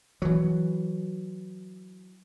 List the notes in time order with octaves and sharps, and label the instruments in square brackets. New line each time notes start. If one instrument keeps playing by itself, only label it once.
[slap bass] E3 F#3